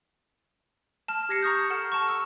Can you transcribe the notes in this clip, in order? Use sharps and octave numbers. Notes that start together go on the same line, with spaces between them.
A5 F6
G4 G#6 A#6 C7 C#7
A#5 C#6 D#6 G6
A4 F#5 F6 E7
A5 A#5 C#6
E6